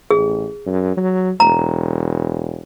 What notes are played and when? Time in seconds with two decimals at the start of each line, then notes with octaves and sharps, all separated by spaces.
0.11 A1 G#4
0.66 F#2
0.97 F#3
1.40 E1 A#5